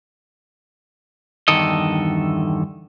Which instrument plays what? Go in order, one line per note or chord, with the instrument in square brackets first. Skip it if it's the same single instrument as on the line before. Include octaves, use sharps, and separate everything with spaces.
[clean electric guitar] E2 G2 D3 D#3 A4 D#5